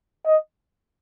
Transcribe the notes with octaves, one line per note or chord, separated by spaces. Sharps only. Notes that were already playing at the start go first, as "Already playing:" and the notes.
D#5